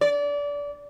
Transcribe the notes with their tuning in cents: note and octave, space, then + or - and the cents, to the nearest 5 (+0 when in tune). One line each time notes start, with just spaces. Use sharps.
D5 -25